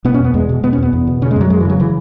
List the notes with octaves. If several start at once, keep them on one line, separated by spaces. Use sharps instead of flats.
B2 B3
C#4
E2 B3
E2 G#3
B2
B2 B3
C#4
E2 B3
E2
B2
C#3 C#4
G#3
F#2 F#3
F#2 G#3
E3
C#3 F#3
C#3 E3